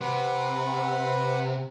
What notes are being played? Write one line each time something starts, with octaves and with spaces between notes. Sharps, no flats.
C3 B4 F#5